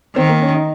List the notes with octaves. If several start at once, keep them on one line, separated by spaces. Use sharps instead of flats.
D#3 C4
A#3
C#4
D#4